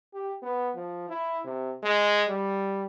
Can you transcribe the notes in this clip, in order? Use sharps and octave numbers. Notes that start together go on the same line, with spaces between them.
G4
B3
F3
E4
C3
G#3
G3